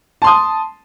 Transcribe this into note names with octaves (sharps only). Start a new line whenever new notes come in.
A5 C6 D#6